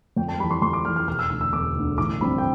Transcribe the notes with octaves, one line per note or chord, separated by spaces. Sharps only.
F2 G5
A5
E3 G3 B5
C6
F2 C6
D6
E3 G3 F6
F6
E1 F6
E6
D2 D3 E6
E6
E1 D6
D2 D3
A1 D6
G2 F3 C4 B5
G5